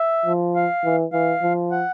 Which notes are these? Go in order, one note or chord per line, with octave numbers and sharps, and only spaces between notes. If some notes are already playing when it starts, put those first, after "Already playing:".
Already playing: E5
F3
F5
E3
E3 F5
F3
F#5